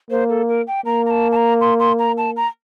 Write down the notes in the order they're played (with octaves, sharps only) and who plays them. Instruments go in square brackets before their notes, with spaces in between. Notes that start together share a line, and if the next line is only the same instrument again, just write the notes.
[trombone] A#3 [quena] C5
[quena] A4
A#4
G5
[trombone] A#3 [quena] A#5
[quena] A#5
A5
A5
A#5
C6
C6
A#5
A5
A#5